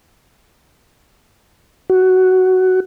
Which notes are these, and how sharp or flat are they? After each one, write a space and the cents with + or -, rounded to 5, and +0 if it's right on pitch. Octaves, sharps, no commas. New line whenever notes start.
F#4 +10